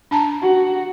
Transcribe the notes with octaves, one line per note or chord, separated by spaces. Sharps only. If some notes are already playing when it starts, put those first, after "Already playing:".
D4 A5 A#5
F#4